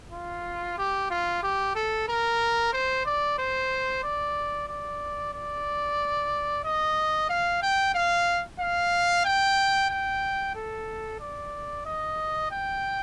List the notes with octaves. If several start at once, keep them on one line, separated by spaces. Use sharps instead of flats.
F4
G4
F4
G4
A4
A#4
C5
D5
C5
D5
D5
D5
D#5
F5
G5
F5
F5
G5
G5
A4
D5
D#5
G5